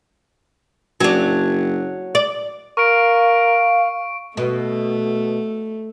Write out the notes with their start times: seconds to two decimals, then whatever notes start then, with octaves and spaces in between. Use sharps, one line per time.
1.00 F#1 F#3 D4
2.15 D5
2.77 A#4 F5 C#6 D7
4.37 B2 A3